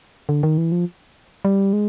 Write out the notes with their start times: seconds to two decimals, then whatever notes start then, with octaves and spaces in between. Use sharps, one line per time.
0.29 D3
0.43 D#3
0.58 E3
0.72 F3
1.45 G3
1.73 G#3